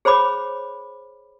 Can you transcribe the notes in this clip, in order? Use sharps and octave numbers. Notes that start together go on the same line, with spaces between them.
G#4 C5 C#5 B5 D6